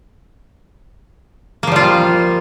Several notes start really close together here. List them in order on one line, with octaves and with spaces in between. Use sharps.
A#3 F3 G3 F4